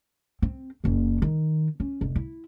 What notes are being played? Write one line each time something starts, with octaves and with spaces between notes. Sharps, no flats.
C4
F#1 A#3
D#3
C#4
F1
E4